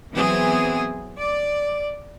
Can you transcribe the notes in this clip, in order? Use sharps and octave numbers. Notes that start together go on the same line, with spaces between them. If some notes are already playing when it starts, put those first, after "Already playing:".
E3 F#3 B3 C4 G#4
D5